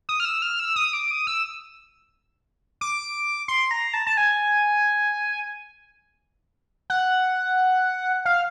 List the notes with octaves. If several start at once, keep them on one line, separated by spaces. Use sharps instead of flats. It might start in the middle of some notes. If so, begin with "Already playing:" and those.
D#6
F6
E6
F6
E6
D#6
D6
D#6
E6
D6
C6
A#5
A5
A5
G#5
F#5
F5